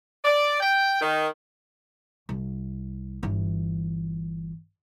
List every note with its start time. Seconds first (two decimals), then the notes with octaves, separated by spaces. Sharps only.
0.24 D5
0.60 G5
1.00 D#3
2.29 C2
3.23 G1 E3